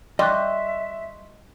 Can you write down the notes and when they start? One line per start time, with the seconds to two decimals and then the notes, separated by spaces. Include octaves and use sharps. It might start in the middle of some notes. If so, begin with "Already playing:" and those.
0.19 G3 D#5 E5 C6 C#6 F#6